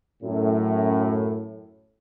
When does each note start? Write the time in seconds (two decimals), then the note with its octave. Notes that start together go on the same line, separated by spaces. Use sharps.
0.22 F#2 A2